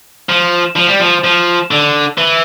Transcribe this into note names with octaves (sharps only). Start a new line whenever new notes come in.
F3
F3
G3
F3
F3
D3
E3